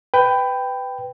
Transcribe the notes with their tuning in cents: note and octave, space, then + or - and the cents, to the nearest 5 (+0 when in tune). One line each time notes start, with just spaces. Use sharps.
B4 +15 G5 +0